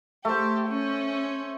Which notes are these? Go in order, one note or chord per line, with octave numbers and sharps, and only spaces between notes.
A3 G4 C5
C#4